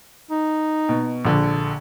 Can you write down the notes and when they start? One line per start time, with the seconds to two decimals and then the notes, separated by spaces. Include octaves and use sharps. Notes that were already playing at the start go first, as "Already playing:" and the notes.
0.31 D#4
0.89 B2
1.25 A#1 D3